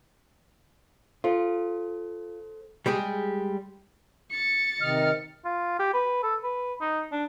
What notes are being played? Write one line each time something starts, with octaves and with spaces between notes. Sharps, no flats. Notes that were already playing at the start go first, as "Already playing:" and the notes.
F4 A4 C5
G3 G#3 G4 G#4
A6 C#7
C3 D#3 D#5 F6
F4
G4
B4
A4
B4
D#4
D4